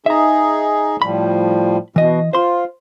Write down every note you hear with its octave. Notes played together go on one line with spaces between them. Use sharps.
D#4 G#4 E5 A#5
A2 F3 G3 B5
B2 E3 D#5
F4 C5 C6